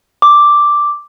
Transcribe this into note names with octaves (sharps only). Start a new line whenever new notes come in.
D6